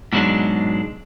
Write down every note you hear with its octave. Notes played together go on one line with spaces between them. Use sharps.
G#2 B2 F#3 G#3 D4